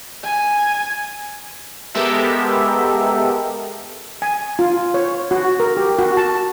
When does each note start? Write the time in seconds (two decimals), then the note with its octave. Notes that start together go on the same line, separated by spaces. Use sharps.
0.24 G#5
1.94 G#3 B3 G4 A4 A#4 E5
4.22 G#5
4.59 F4
4.94 C#5
5.31 F#4
5.60 A#4
5.77 G4
5.99 F#4
6.17 A5